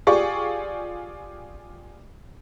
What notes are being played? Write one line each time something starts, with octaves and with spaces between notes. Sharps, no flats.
F4 G4 G#4 D5 C#6